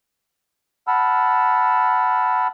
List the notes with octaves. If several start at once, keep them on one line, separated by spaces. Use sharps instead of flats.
F#5 A5 B5 E6 F6